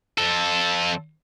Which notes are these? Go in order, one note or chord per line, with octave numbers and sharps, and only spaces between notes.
F2 A4